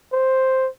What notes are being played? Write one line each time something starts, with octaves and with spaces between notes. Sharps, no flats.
C5